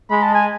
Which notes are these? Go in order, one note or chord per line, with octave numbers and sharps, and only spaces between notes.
G#3 B5
A5
G#5